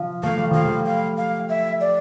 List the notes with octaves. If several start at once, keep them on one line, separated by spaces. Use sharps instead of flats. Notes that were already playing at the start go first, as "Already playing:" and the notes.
Already playing: F3
A3 F5
G3
F3 F5
G3
F5
F5
E5
D5